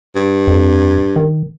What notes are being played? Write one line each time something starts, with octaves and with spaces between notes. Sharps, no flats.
G2
F2
D#3